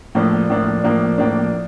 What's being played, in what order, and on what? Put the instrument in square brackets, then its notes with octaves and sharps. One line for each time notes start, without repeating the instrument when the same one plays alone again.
[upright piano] A2 F3 A#3 D4
A2 F3 A#3 D4
A2 F3 A#3 D4
A2 F3 A#3 D4